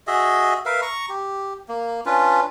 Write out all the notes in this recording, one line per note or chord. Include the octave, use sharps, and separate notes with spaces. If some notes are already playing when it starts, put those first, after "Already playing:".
F#4 G#4 D#5 E5
A#4 B4 E5 F5
A#5 C#6
G4
A#3
C#4 D4 F4 B4